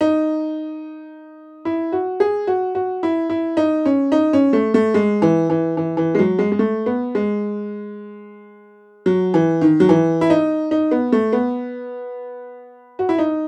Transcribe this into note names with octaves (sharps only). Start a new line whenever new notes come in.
D#4
E4
F#4
G#4
F#4
F#4
E4
E4
D#4
C#4
D#4
C#4
A3
A3
G#3
E3
E3
E3
E3
G#3
F#3
G#3
G#3
A3
B3
G#3
F#3
E3
D#3
F#3
E3
E4
D#4
D#4
B3
A3
B3
F#4
E4
D#4